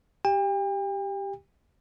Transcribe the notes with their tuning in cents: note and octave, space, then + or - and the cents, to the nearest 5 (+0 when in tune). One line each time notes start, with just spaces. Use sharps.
G4 +0 G5 +40